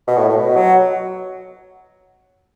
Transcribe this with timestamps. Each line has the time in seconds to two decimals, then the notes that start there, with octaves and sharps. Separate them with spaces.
0.07 B2
0.18 A2
0.29 A2
0.37 B2
0.56 F#3